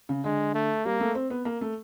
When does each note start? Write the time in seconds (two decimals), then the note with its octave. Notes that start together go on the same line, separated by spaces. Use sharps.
0.09 C#3
0.24 D3 G#3
0.55 A3
0.85 G3 A#3
1.00 A3
1.15 C4
1.30 B3
1.45 A#3
1.61 A3